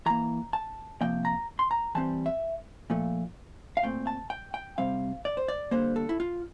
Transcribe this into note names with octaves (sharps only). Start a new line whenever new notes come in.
E3 A#3 A#5
A5
C3 F3 A#3 G5
A#5
C6
A#5
E3 G3 C4 A5
E5
A#2 F3 A3
F5
A#2 A3 C4 G5
A5
G5
G5
C3 G3 C4 F5
D5
C5
D5
D3 G3 A#3 C5
A4
E4
F4